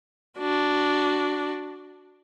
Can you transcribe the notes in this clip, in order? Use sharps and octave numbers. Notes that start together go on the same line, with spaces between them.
D4 F#4